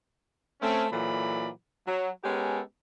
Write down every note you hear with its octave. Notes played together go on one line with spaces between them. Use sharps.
A3 C4 C#4
A#2 E3 F#3 A4 D5 B5
F#3
G#3 B3 C#4 G4 A4 A#4